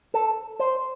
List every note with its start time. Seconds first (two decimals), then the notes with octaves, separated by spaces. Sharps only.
0.14 A4
0.59 C5